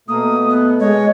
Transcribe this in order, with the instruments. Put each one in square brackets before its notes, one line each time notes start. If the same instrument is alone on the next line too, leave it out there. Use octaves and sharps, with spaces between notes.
[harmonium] B2 A3 [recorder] A#3 [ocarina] D#6
[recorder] B3
[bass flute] G#3 [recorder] C#5 [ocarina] D#5